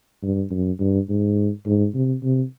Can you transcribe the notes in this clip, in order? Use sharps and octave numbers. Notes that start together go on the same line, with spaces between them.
G2
F#2
G2
G#2
G#2
C3
C3